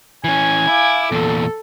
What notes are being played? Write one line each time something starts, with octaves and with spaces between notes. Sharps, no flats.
E3 C#4 G#5
E4 F5 D6
E2 A#2 A4